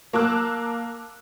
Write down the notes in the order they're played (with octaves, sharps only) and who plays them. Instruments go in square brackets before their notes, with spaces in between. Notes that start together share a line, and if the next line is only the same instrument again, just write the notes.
[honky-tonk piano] A#3 A5 D6 E6 F#6